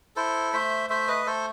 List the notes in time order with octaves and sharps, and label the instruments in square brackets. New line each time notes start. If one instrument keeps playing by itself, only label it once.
[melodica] E4 A4 C5
A3 C5 E5
A3 C5 E5
B4 D#5
A3 A4 C5